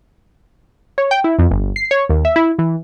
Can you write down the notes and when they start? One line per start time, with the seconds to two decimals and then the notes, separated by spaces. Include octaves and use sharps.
0.98 C#5
1.11 G5
1.24 E4
1.39 F2
1.51 G1
1.76 C7
1.91 C#5
2.09 D#2
2.25 E5
2.36 E4
2.59 E3